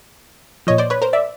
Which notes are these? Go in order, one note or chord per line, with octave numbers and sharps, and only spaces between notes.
A#2 F3 C#5 D#5
C5 D5
B4 C#5
A#4 C5
D5 E5